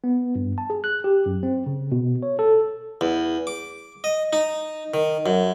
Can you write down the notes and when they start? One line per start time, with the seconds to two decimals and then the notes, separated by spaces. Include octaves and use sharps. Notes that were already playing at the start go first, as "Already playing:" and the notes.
0.04 B3
0.35 G2
0.58 A5
0.70 G#4
0.84 F#6
1.04 G4
1.26 F#2
1.43 C4
1.66 C#3
1.92 B2
2.23 C#5
2.39 A4
3.01 E2
3.47 D6
4.04 D#5
4.33 D#4
4.94 D#3
5.26 F#2